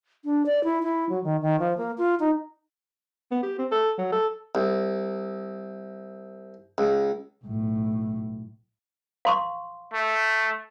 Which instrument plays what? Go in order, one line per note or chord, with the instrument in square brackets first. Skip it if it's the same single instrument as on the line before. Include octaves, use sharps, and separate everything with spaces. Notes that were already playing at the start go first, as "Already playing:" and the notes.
[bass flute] D4
D5
E4
E4
F#3
D#3
D#3
F3
A#3
F4
D#4
[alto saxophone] B3
G4
C4
A4
F#3
A4
[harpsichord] C2
C#2
[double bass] B1 A2
[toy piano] F5 C6 C#6
[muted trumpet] A3